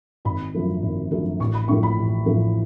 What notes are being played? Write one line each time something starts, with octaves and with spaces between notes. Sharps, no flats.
G#1 B5
F#2 D3 F3 A3
G#1
F#2 D3 F3 A3
A1 C#6
B5
A2 F3 A3 C#6
B5
A1
A2 F3 A3